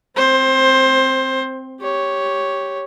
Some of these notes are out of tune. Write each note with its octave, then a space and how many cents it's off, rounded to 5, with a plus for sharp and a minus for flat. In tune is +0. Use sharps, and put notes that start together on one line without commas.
C4 +0 C5 +20
G4 +0 C#5 +0